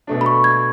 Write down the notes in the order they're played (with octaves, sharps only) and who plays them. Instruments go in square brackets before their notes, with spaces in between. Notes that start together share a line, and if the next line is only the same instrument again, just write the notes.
[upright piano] B2 A3 D4
[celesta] B5
C#6
G#6